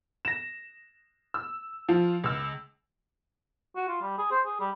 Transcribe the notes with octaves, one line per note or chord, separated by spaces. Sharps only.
A#6 E7
E6
F3 F4
C#2 E6
F#4
F4
G3
G#4
C5
G#4
G3